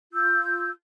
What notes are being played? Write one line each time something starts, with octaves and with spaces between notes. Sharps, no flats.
F4 E6 G6